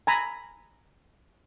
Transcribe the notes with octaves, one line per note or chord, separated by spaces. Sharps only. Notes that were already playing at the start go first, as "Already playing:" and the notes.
G#5 A#5 B5